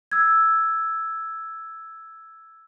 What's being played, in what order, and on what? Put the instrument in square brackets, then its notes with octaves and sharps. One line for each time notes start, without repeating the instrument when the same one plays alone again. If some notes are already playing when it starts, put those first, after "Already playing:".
[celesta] E6 G#6